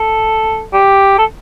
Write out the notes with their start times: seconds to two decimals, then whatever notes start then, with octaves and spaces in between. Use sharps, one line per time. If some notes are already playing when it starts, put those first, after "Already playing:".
Already playing: A4
0.73 G4
1.19 A4